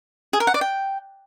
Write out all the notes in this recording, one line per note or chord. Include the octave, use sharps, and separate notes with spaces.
G#4
A#4
F#5
D5
G5